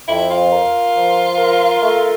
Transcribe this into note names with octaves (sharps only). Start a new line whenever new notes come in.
F2 E4
F4
A#4
F3
A#4
A3